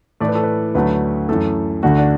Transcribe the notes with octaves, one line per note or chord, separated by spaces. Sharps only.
A2 E3 A3 D5
B4
A4
B4
D2 D3 F#3 A3 B4
F#2 E3 A3 A4
D2 D3 A3 F#4
D4